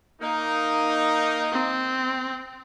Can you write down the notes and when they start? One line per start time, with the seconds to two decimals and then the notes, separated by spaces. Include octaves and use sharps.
0.21 A#3 D#4
1.52 C4